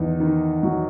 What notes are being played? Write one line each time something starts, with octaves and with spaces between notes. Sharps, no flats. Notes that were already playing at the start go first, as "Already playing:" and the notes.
Already playing: E2 D#3 D#4
D#3
F#3